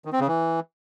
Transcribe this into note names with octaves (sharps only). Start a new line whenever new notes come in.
D#3
C4
C#3
E3